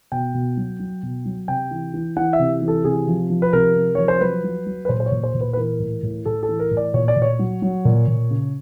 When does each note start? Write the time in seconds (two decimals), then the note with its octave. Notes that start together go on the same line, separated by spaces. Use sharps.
0.12 B2 G5
0.34 B2
0.57 F#3
0.80 F#3
1.03 B2
1.25 F#3
1.48 C3 G5
1.71 E3
1.94 E3
2.16 E3 F#5
2.33 E5
2.39 C3
2.62 E3
2.68 A4
2.84 C3 G#4
3.08 F3
3.30 F3
3.42 B4
3.53 C3 A#4
3.76 C3
3.95 F3 C#5
4.08 C5
4.21 F#3 B4
4.44 F#3
4.66 F#3
4.85 B4
4.89 A#2 C5
5.00 C5
5.06 C#5
5.12 A#2
5.23 C5
5.34 A#2
5.40 B4
5.53 B4
5.57 E3 A#4
5.80 A2
6.03 A2
6.25 A2 A4
6.43 A4
6.49 E3
6.59 A#4
6.71 A2
6.77 D5
6.94 A#2 C#5
7.08 D5
7.16 A#2
7.22 C#5
7.39 F#3
7.62 F#3
7.85 A#2
8.08 A#2
8.30 C#3